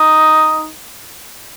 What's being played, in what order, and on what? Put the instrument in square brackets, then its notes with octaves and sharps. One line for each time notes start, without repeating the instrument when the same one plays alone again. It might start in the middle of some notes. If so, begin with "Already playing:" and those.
Already playing: [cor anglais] D#4